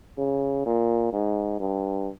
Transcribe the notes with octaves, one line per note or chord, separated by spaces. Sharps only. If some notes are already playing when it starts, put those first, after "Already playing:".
C#3
A#2
G#2
G2